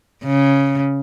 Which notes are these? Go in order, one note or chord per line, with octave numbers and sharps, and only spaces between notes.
C#3